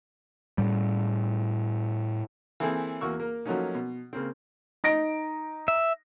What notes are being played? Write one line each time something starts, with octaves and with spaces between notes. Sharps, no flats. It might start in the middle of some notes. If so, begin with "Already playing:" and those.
A2 G3
E3 A#3 C4 E4 G#4 A4
E2 A#3 F#4 C#6 E6
A#3 A#4
F3 F#3 A3 A#3 C#4 D#4
B2
C#3 A#3 C4
D#4 A#6 D7
E5